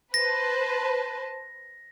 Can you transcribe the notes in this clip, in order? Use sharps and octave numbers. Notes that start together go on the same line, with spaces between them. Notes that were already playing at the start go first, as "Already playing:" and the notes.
B4 C5 A5 A#6